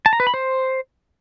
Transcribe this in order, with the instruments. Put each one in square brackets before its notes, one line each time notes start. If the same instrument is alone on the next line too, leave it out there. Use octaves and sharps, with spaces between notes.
[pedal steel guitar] A5
A#5
B4
B5
C5